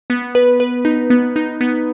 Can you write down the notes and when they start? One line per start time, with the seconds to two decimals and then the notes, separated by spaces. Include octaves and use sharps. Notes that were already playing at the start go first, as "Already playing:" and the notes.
0.10 B3
0.35 B4
0.60 B4
0.85 D#4
1.10 B3
1.36 D#4
1.61 B3